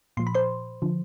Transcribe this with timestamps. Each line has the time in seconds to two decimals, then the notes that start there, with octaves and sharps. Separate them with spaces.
0.17 A#2 F3 C6
0.27 B5
0.35 C5 C6
0.82 D3 F3